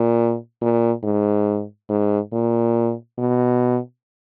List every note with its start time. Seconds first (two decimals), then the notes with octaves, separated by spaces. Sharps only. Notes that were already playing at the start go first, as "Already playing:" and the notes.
Already playing: A#2
0.61 A#2
1.03 G#2
1.89 G#2
2.33 A#2
3.18 B2